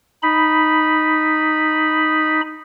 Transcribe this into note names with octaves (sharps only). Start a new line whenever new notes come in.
D#4 B5